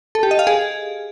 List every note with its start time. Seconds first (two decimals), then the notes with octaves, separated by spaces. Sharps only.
0.15 A4
0.23 G4
0.31 D#5
0.39 F5
0.47 G#4